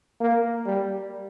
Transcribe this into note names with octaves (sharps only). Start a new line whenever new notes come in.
A#3
G3